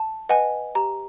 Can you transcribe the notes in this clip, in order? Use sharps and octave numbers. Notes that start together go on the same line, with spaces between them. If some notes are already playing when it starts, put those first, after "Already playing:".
Already playing: A5
B4 D#5 F#5 G#5
G4 A#5